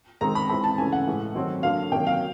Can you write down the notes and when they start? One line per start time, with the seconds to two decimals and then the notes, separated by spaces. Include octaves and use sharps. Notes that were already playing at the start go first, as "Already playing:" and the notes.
0.21 D#3 G#3 C4 A#5
0.35 B5
0.49 E3 G#3 C4 B5
0.64 A5
0.78 C#3 E3 A3 G#5
0.92 F#5
1.07 A2 E3 G#3
1.35 D#3 F#3 A3 C4
1.63 D3 F#3 A#3 F5
1.92 C3 D#3 F#3 A#3 G5
2.07 F5